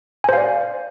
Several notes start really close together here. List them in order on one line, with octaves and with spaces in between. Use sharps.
G#5 C5 F5 D5